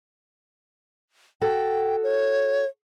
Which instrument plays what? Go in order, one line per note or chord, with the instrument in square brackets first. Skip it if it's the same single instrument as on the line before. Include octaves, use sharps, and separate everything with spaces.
[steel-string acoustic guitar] F#4 A4 [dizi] G5
[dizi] C#5